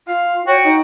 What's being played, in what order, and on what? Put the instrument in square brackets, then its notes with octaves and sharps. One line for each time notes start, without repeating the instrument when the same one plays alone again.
[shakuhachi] F4 [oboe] F5
[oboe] F#4 [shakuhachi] C#5 [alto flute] G5
[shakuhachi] D#4